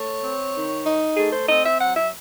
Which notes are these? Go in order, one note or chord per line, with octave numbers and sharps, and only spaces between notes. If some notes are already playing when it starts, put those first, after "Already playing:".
Already playing: A3 C#5
C4
D#3
D#4
A3 G#4
C5
C4 D#5
E5
F#3 F#5
E5